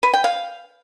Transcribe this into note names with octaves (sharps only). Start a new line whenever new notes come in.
B4
G5
F5